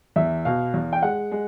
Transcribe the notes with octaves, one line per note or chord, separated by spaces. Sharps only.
E2 E5
B2 F5
E2
G5
G#3 F#5
G#3